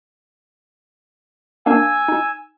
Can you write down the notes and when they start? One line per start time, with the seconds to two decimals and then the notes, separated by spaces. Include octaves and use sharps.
1.66 A#3 D4 F5 G#5 E6
2.08 D#4